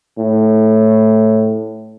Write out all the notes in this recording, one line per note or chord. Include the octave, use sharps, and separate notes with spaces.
A2